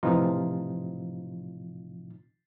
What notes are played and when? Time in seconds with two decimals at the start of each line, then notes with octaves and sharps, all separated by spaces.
0.03 A2 C3 E3 F3 D#4 F4